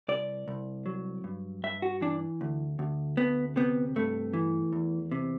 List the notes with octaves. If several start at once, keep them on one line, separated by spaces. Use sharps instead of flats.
C2 D5
C2
F#3
G2
G2 E5
F#4
E3 D4
D2
D2
D2 B3
C3 B3
G2 A3
E3
E2
C3